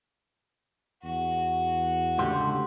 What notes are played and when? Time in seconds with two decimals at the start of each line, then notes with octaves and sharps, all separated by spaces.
1.04 E2 F#4
2.18 C#2 D3 A3 G4 C5